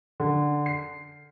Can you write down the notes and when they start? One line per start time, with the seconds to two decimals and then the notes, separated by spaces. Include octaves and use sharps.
0.20 D3
0.66 C7